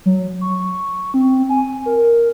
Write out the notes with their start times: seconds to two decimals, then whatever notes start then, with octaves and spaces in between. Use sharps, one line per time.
0.06 F#3
0.41 C#6
1.14 C4
1.49 G#5
1.86 A#4